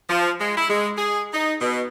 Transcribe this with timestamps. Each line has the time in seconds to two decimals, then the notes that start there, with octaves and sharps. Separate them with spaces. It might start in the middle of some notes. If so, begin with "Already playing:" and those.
0.09 F3
0.40 G#3
0.57 E4
0.70 G#3
0.98 G#4
1.33 D#4
1.60 B2